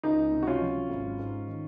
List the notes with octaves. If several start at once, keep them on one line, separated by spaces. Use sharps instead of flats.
C#2 D#4
C3
F#4
C#4 F4
F#3
G#1
G#2
D#3